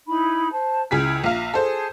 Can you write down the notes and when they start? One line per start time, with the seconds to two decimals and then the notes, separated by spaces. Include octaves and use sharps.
0.07 D#4 E4 B5
0.51 C5 A5
0.91 C#2 E4 G#4 G5 F6 B6
1.24 A#1 E5 F5 A#5
1.54 G#4 A4 C5